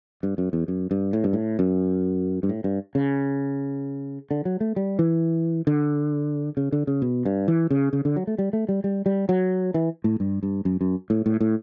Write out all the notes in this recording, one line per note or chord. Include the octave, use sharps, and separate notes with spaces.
G2
F#2
E2
F#2
G2
A2
G2
A2
F#2
G2
A2
G2
C#3
D3
F#3
A3
G3
E3
D3
C#3
D3
C#3
B2
G2
E3
C#3
C#3
D3
F#3
A3
G3
A3
G3
G3
G3
F#3
E3
A2
G2
G2
F#2
F#2
A2
A2
A2